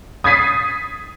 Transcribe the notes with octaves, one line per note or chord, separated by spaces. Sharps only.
D#6 G#6 A6 B6 C7 D#7